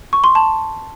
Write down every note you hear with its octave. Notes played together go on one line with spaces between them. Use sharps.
C#6
C6
A5